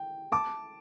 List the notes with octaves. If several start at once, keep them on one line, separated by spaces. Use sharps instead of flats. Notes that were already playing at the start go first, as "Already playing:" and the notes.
Already playing: G5
A5 D6